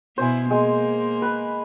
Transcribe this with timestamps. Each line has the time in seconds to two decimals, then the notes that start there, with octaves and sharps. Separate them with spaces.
0.18 B2 E4 C5 G#5
0.51 G#3 A#3
1.22 B4